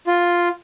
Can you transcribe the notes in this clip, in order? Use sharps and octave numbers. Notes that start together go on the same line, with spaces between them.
F4